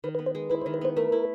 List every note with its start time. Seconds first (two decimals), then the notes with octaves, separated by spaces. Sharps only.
0.04 D#3 B4
0.15 B4
0.19 B3
0.26 C5
0.35 G#3
0.50 E4 B4
0.62 C5
0.66 D#3
0.74 B4
0.81 B3 C5
0.97 A3 A#4
1.12 E4